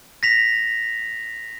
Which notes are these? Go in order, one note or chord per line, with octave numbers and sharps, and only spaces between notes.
A#6 B6 F7